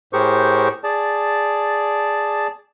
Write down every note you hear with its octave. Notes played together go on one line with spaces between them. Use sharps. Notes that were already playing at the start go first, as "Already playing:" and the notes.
A2 G4 G#4 A#4 C5 C#6
G#4 D5 A5